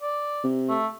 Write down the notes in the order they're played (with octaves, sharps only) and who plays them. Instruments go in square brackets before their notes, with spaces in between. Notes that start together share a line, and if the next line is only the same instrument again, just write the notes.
[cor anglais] D5
[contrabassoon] C3
[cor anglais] A3